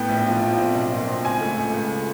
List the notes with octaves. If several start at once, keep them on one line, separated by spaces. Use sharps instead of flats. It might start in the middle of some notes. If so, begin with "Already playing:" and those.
Already playing: A2 B3 G5
A#1
F3
A#1
C4
B1
A#2
C4
C#2 G#5
A3
C#2
C#2